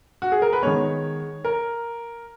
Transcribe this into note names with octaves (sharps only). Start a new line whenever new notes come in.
F#4
G#4
A#4
B4
D#3 G#3 B3 C#5
A#4